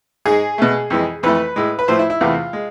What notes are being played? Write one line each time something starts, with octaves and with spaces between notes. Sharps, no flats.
G#2 G#3 G#4
B2 A3
F2 E3 G#3
F2 E3 A3 B4
A2 G#3
B4
A2 F3 A3 C5
E4
E4
E2 C3 E3 A3 F4
G#3